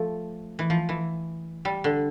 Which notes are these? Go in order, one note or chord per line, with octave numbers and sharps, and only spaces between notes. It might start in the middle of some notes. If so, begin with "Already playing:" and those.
Already playing: F3 A3
E3
F3
E3
G3
D3